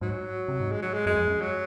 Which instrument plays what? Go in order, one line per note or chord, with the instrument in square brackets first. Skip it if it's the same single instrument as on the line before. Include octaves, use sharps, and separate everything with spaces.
[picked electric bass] G#2 [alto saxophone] F#3
[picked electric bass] C3
G#2
[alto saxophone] G#3
F#3
G#3
[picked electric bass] F#2 [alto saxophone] G#3
[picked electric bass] F2
F#2
[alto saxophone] F#3